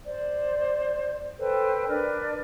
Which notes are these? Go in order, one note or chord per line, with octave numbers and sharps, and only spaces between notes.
C5 D5
A4 B4 C5 G5
D4 A#4 B4 D5